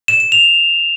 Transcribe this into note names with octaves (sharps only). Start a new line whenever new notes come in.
E7
E7
F7